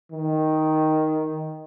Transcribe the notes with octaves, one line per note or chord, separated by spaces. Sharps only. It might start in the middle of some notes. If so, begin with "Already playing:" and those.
D#3